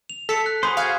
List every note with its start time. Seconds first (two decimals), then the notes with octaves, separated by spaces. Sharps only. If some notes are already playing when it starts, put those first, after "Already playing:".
0.10 F7
0.29 A4 B6 C#7
0.46 F#6
0.63 F#4 G#4 C5 B5 D#6
0.77 F5 G#5 F#6 G#6